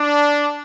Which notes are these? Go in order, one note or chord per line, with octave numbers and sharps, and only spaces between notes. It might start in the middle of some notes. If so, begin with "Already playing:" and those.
Already playing: D4